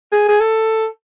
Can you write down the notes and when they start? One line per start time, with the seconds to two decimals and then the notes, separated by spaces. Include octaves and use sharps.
0.12 G#4
0.28 G#4
0.40 A4